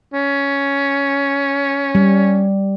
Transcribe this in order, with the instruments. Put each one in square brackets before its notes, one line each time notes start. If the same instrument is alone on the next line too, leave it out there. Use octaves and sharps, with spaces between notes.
[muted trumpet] C#4
[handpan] G3